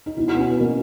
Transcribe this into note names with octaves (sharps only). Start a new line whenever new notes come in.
D#4
B2 E4
F#4
B3
C#4
B3
B2 A#3